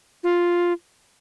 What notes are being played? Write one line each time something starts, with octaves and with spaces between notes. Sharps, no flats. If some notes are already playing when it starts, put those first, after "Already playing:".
F4